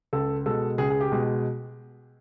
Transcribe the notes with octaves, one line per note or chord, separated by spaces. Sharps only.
C#2 A4
B2 G#3 A4
C#2 G#4
G#4
G4
B2 G#3